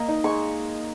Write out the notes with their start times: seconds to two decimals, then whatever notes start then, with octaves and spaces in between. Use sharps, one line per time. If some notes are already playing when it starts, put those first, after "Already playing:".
Already playing: A#3 D#5
0.08 D#4
0.24 G#3 C#6